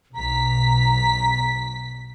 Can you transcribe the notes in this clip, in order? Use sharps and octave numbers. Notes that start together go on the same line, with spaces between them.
B1 A#5 B6